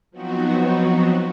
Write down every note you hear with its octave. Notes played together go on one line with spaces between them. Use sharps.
F3 F#3 B3 C4 D#4 F#4